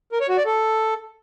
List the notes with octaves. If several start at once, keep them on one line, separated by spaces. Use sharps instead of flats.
A#4
C#5
F#4
D5
A4